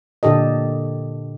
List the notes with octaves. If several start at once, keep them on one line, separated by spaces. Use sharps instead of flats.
A#2 D3 G4 A4 D#5